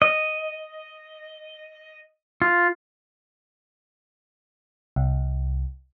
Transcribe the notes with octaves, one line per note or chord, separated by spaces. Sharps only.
D#5
F4
C2